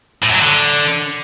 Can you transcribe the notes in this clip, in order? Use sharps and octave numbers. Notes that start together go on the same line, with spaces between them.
A2
F#2
F#3
D3